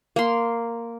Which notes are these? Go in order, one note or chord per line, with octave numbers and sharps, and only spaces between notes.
A#3 C6